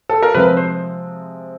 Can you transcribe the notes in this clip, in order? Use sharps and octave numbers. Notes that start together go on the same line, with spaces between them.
A4
A#4
C3 F3 G#3 C4 B4
C5